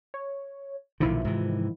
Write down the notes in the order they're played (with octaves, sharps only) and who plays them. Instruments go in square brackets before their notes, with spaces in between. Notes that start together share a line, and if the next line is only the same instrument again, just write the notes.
[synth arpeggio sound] C#5
[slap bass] B1 A#2 D3 [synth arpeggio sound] D#3 F3 E4
[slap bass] G#2 C3 E3